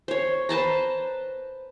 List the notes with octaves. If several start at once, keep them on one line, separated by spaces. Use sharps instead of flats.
C5 C#5
B4 C5 A5 A#5